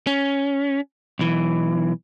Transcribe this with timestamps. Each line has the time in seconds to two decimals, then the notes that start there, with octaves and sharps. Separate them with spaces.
0.07 C#4
1.19 B1 E3